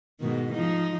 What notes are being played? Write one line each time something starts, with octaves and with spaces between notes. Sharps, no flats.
G#2 B2 D#3
F3 D#4